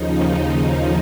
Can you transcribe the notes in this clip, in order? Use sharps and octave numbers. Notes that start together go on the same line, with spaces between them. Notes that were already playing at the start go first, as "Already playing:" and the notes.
Already playing: D#2 C#3 F3 D#4